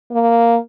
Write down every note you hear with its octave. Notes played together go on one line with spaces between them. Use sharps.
A#3